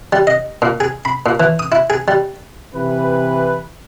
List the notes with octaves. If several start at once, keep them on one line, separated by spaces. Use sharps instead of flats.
G3
D#5
A#2
G#4
B5
A#2
E3
D#6
E4
G#4
G3
C3 E3 B4